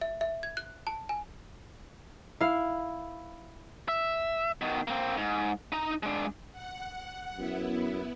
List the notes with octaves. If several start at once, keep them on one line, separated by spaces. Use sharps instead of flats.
E5
E5
G#6
F#6
A5
G#5
E4 F5
E5
B2 D#3
A#3 C4
G#2
D#4 A#5
G#3 D4
F#5
F#2 B3 E4